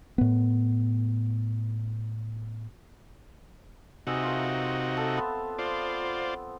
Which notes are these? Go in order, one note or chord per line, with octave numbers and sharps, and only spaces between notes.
A2 B3
C3 D#4 F#4 G#4 E5
F4 A#4
A4
B3 C4
F4 C5 D5